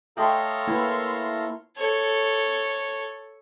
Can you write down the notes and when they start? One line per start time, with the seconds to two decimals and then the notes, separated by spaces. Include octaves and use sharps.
0.17 A3 A4 C#5 D#5 F5 G5 A#5 C6
0.67 A#3 E4 B4 F#5
1.77 A4 C#5